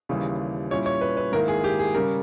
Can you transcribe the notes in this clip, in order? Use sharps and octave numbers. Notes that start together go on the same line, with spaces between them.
D#2 C#3 E3 G3
A#2 G3 C#4 E4 C#5
C#5
B4
B4
G#2 D#3 A#3 E4 A#4
G#4
G4
G#4
C#3 G3 C#4 A#4